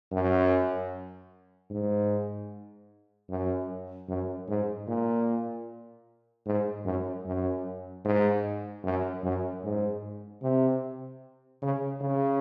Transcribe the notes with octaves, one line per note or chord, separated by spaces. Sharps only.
F#2
G#2
F#2
F#2
G#2
A#2
G#2
F#2
F#2
G#2
F#2
F#2
G#2
C3
C#3
C#3